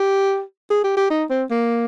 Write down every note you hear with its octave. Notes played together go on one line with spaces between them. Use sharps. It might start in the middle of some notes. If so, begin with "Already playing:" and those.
Already playing: G4
G#4
G4
G4
D#4
C4
A#3